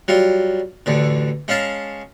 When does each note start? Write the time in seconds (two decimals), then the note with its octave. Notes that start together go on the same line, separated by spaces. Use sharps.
0.08 F#3 G3 F4
0.86 A1 D2 D3
1.48 G#3 C#4 F5 A5 A#5